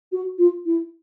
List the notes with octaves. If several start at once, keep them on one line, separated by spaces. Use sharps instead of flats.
F#4
F4
E4